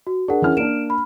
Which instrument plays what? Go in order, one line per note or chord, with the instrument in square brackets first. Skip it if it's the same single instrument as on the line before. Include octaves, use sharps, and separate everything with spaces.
[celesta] F#4
[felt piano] D4 [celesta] G#4 A#4 F#5
[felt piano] E3 C#4 F6
[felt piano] A#3 D4 [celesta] D7 E7
[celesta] B5